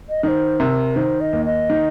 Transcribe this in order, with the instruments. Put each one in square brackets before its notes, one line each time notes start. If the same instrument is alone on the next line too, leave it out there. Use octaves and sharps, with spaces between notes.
[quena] D#5
[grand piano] D#3 [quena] C5 D#5
[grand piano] C3 [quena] A#4
[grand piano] D#3 [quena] C5
[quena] D#5
[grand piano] D#2
[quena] D#5
[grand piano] D#3